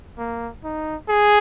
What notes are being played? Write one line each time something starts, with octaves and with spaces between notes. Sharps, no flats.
A#3
D#4
G#4